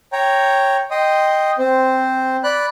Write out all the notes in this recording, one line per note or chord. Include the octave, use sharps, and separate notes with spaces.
C#5 G5 A#5
D#5 G5 C6 D#6
C4 C5
D5 B5 F#6